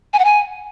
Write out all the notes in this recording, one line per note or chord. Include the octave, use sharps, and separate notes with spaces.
G#5
F#5
G#5